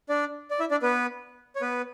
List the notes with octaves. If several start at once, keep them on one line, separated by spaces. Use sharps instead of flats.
D4 D5
D5
E4 E5
D4 D5
B3 B4
C#5
B3 B4